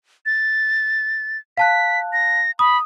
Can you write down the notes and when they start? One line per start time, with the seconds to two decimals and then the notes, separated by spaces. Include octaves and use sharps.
0.26 A6
1.57 F5 A5 F#6 B6
2.13 A#6
2.59 B5 D#6